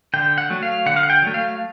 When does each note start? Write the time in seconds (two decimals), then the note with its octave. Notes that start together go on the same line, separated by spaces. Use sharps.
0.14 D3 G5
0.38 F#5
0.50 F#3 A3
0.63 F5
0.86 D3 F#5
0.96 F5
1.03 F#5
1.10 G5
1.22 F#3 A3
1.34 F5